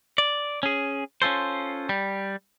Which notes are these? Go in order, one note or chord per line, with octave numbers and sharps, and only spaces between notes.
D5
C#4 G#4
C#4 F4 A4 C5
G3